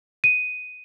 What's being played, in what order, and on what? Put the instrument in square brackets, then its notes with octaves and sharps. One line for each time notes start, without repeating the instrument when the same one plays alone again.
[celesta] D#7